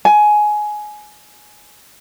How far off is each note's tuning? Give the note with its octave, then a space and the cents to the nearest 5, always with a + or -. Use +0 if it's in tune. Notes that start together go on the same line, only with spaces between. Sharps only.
G#5 +15